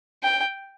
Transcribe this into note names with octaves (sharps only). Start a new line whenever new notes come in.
G5